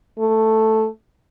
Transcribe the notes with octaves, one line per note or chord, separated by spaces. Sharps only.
A3